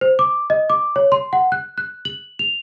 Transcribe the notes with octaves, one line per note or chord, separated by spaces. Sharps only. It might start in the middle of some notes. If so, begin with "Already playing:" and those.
C5
D6
D#5
D6
C#5
C6
F#5
F#6
F#6
F#7
F7